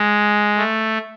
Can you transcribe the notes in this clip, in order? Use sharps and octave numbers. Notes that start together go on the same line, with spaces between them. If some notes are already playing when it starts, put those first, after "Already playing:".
Already playing: G#3
A3